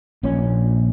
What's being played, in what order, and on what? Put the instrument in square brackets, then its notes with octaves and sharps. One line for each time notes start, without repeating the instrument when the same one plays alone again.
[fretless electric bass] A#1 A#2 C#4